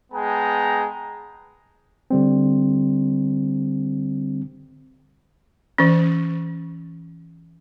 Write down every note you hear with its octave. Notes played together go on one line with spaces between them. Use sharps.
G#3 B3 G5 A5 A#5
D3 G3 C4
E3 C#4